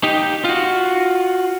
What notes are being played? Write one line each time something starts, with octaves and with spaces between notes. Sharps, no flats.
D#4 G4
F4 F#4